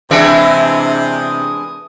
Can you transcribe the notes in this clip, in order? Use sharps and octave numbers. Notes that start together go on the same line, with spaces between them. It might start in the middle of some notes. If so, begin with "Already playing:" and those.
C3 E3 G#3 D4 E5
D#6